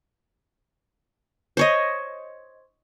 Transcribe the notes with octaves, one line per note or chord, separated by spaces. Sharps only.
C5 C#5 D#5